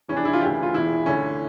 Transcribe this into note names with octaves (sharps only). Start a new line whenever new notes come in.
F1 E2 E3 C#4
D4
E4
F4
D2 C#3 E3 G4
F4
E1 E2 E3 E4
D2 D3 C#4